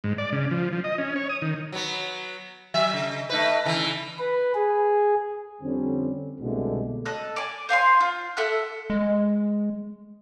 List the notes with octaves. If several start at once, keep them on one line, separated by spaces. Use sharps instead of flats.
G#2
D5
C#3
F3
F3
D#5
C#4
C#5
D#6
D#3
F#3 B3
F#3 E5
C#3
A3 D#4 B4
C#3 E3
B4
G#4
F2 D3 G3 C4 C#4
C2 B2 D3 G#3 A3
A4 D#5 F#6
D5 G#5
C5 F5 G#5 C6
F4
A4 E5 F#5 F#6
G#3